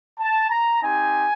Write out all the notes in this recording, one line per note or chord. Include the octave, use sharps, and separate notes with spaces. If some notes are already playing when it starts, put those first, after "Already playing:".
A5
A#5
C4 D#4 G4 G#5